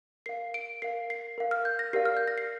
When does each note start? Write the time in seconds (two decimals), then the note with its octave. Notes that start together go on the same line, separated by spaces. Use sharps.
0.26 A#4 F5 C7
0.54 D7
0.82 A#4 F5 C7
1.10 C7
1.38 A#4 F5
1.51 F6
1.65 G6
1.79 A#6
1.93 G4 A#4 D5 F5 C7
2.05 F6
2.17 G6
2.28 A#6
2.38 C7